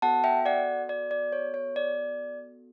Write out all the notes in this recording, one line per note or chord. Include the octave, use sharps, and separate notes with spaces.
B3 F#4 A4 F#5 A5
E5 G5
D5 F#5
D5
D5
C#5
C#5
D5